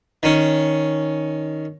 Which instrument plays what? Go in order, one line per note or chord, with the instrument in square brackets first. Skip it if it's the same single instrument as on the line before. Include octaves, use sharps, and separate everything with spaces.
[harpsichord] D#3 C#4